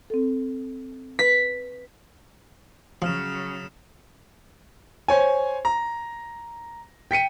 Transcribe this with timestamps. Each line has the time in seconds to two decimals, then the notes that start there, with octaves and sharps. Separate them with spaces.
0.10 C4 A4
1.19 B4 B6
3.02 C#3 F3 F#3 D#6 F6 E7
5.08 C5 C#5 G#5
5.65 A#5
7.11 G5 B6 C#7 D#7